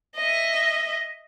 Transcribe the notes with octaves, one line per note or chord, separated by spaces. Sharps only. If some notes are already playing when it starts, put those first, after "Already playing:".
D#5 E5